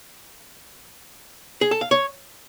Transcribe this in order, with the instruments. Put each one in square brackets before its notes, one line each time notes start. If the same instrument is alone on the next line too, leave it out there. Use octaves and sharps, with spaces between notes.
[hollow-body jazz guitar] G#4
A4
F5
C#5